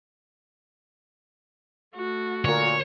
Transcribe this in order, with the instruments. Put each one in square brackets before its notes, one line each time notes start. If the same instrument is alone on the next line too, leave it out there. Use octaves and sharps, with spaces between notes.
[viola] A3 F#4
[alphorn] A#2 [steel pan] D3 A#4 [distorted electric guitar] C#5